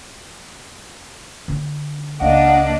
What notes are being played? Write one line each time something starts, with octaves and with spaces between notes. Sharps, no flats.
D3 D4
C#2 A#3 D4 D#5 F5 F#5